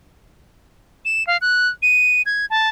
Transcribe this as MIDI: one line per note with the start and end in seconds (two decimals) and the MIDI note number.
1.05 1.26 100
1.27 1.37 77
1.41 1.68 90
1.82 2.22 99
2.26 2.46 92
2.50 2.69 81